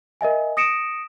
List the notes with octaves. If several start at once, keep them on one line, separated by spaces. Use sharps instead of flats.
A#4 D#5 E5 G#5
D#6 A#6 C#7 D7 E7